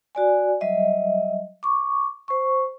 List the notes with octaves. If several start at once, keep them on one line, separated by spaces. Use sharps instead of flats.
F#4 D5 G#5
F#3 G3 D#5 E5
C#6 D6
C5 C#6